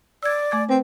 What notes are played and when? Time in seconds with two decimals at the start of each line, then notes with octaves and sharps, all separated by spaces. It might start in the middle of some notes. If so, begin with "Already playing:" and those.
0.23 D5 E6 G#6
0.51 A3 D6 G#6
0.69 C4 B4